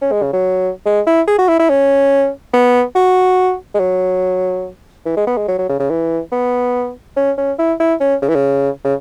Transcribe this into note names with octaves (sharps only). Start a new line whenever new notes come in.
C#4
G#3
C#3
F#3
G#3
E4
G#4
F#4
E4
E4
C#4
B3
F#4
G#3
F#3
E3
G#3
B3
G#3
F#3
F#3
C#3
C#3
E3
B3
C#4
C#4
E4
E4
C#4
C#3
E3
C#3
C#3